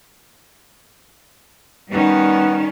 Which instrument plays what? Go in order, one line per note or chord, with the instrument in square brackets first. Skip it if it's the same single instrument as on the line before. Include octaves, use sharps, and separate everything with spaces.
[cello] D#3 C#4 [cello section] G3 [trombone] B3